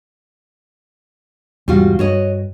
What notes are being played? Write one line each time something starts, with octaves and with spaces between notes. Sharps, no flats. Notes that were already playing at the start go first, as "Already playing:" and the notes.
E2 G#2 C3 G3 F4 F#4
G2 F#4 C#5 D#5